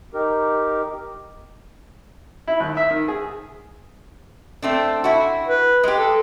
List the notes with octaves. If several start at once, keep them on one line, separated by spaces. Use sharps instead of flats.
D#4 G4 A#4
E4
D#2
E5
D#3
G#4
A3 C4 D4
E4 F#4
B4
G#3 G4
A4